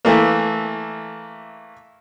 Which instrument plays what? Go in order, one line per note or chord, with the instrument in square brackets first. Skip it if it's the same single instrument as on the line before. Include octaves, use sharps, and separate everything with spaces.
[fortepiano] E3 A3 A#3